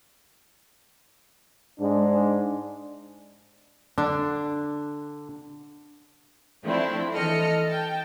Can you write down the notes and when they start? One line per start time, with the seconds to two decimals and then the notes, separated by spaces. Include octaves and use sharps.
1.80 G#2 G#3 D4
3.98 D3 D4
6.63 F3 A3 C4 D4 E4
7.14 E3 A4 D#5 F6 C#7
7.67 G5 A5